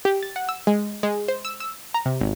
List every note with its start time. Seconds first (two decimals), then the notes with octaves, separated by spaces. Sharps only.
0.05 G4
0.23 A6
0.36 F#5
0.49 E6
0.67 G#3
1.03 G#3
1.28 C5
1.45 E6
1.60 E6
1.94 A#5
2.06 C3
2.21 G#1